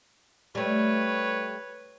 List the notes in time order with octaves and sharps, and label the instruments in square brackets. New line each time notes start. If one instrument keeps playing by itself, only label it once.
[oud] G3 A3 [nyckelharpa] B4 C#5